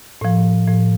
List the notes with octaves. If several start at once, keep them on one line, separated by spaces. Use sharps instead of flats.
A2 F3
A2 F3